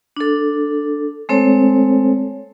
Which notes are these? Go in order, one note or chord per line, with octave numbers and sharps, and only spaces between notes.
D4 A4
G#3 A3 C4 A4 C5 C#5